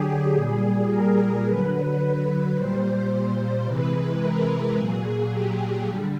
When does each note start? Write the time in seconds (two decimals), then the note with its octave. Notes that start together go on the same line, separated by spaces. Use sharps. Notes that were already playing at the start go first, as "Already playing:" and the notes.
Already playing: D3 F#3 G4 G#4
0.34 A#2 G3 G#4
0.89 A#4
1.44 D3 F#3 B4
2.55 A#2 G3 C5
3.65 C3 E3 G#3 B4
4.21 A#4
4.75 A#2 F#3 G#4
5.31 G4
5.86 D3 G3